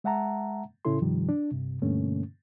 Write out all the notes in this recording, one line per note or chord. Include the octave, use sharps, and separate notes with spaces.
G#3 E5 F#5 A5 A#5
A2 C#3 C#4 E4 A4 C6
G2 C3 D#3 F3 G3
D4
G2 C3
G2 B2 D3 A3 A#3 C#4